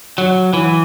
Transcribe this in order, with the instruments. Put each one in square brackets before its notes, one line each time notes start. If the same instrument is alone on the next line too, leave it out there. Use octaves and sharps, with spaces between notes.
[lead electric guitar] F#3
E3